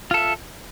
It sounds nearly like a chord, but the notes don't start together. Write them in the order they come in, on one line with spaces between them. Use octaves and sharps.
F4 A4 E5